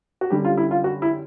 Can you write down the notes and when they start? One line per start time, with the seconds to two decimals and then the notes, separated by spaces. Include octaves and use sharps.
0.21 F#4
0.30 F#2 D3 G3 G4
0.45 F4
0.57 E4
0.71 F4
0.84 F#4
1.02 E4